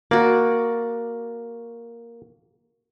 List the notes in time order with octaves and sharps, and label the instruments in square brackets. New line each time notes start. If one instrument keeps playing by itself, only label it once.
[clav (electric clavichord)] A#3 [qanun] F#4 D5